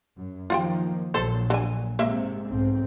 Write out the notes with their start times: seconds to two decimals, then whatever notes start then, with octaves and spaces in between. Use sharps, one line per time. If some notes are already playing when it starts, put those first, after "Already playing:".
0.16 F#2
0.50 D#3 F3 A#3 F4 F#5 G5
1.14 A#1 A#2 F#3 A4 C5
1.50 D3 G#5
1.99 G#2 C3 A#3 E5
2.48 B1 G#2 C4